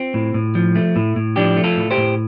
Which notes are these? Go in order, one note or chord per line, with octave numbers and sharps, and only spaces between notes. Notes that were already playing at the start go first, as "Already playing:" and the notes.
Already playing: C4 F4
A2
A2
F3
A3
A2
A2
F3 D4 G4
A3
F4 A4
A2
G4 C5
A2